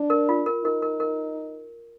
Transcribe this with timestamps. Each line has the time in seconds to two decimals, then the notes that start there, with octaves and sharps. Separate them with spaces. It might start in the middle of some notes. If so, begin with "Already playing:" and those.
Already playing: D4
0.10 A#4
0.29 F4
0.46 A#4
0.64 D#4 A#4
0.82 A#4
1.00 A#4